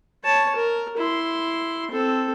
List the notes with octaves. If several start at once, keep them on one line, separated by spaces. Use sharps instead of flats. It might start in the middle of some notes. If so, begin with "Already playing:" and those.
C#5 A5
A#4
E4 C6
C4 A4